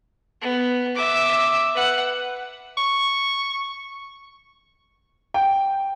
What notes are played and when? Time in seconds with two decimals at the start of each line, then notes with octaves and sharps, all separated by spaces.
0.41 B3
0.95 E5 D6
1.74 B4 F#5
2.77 C#6
5.34 G5